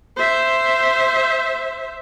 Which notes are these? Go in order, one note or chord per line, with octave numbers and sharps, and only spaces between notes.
C5 E5